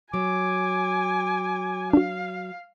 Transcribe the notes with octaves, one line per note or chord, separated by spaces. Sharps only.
F#3 G#5 D6
D4 F#4 F5